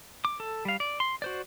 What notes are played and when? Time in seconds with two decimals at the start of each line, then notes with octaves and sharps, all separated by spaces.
0.25 D6
0.40 A4
0.65 G3 F5
0.80 D5
1.00 C6
1.22 F#4 C5 D5